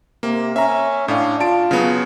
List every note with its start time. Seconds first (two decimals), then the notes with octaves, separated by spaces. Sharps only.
0.23 C3 A#3
0.56 C#4 E5 A#5
1.08 A2 D4 F5
1.40 F4 A5 D7
1.71 C#3 F#3 B3